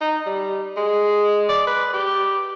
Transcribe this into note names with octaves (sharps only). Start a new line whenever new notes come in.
D#4
G3
G#3
D5
B4
G4